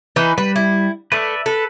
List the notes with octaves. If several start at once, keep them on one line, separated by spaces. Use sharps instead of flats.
E3 D#4 B4
G3 B4
E4
A3 B4 D5 E5
A4 B4